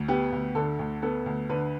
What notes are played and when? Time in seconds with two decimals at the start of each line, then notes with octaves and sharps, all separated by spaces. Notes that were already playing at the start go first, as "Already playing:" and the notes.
Already playing: D2
0.08 B3 G4
0.32 D2
0.55 D3 A4
0.79 D2
1.02 B3 A4
1.26 D2
1.49 D3 B4